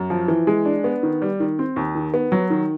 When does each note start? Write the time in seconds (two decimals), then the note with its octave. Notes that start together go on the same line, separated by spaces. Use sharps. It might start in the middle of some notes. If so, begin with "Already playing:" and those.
Already playing: F#2
0.10 F3
0.28 E3
0.47 G#3
0.65 D4
0.84 B3
1.03 D#3
1.22 G3
1.40 D#3
1.59 C4
1.76 D#2
1.95 D#3
2.14 B3
2.32 F#3
2.50 D#3